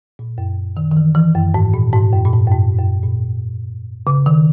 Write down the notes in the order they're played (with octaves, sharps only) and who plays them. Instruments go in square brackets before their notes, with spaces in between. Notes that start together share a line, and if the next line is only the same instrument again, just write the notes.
[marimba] A#2
F#2
D#3
D#3
E3
E3
F#2
G#2
A#2
G#2
F#2
A#2
G#2
F#2
G#2
F#2
A#2
C#3
D#3